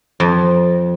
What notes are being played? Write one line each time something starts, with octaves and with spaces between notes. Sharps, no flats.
F2